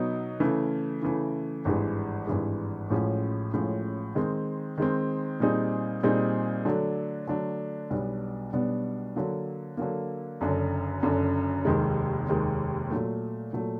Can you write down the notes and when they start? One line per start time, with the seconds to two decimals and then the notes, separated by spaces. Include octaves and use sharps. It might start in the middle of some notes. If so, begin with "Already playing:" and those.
Already playing: B2 F#3 B3 D#4
0.40 C#3 E3 A3
1.02 C#3 E3 A3
1.65 G#1 G2 E3 G#3
2.27 G#1 G2 E3 G#3
2.90 A1 A2 F3 G#3 C#4
3.53 A1 A2 F3 G#3 C#4
4.15 D#3 G#3 C4
4.78 D#3 G#3 C4
5.40 A#2 G3 C4 D#4 G#4
6.03 A#2 G3 C4 D#4 G#4
6.65 D3 F#3 A3 D4
7.28 D3 F#3 A3 D4
7.90 B1 B2 G3 B3 D4
8.53 B1 B2 G3 B3 D4
9.16 D3 F#3 A#3
9.77 D3 F#3 A#3
10.41 F#1 F#2 D3
11.03 F#1 F#2 D3
11.65 F1 D#2 D#3 G#3
12.28 F1 D#2 D#3 G#3
12.90 A#2 F#3 A3
13.53 A#2 F#3 A3